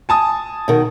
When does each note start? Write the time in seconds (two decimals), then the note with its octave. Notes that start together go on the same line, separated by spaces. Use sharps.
0.09 G#5 A5 D#6
0.68 B2 D#3